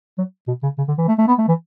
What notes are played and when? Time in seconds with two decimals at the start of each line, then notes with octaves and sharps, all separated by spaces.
0.18 F#3
0.48 B2
0.63 C#3
0.78 C#3
0.88 D3
0.98 E3
1.08 A3
1.18 A3
1.28 B3
1.38 A3
1.48 E3